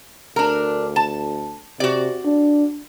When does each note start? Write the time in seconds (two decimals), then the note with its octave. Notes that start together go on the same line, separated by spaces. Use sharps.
0.36 D2 D4 A#4
0.96 A5
1.80 C3 F#4 D5
2.25 D4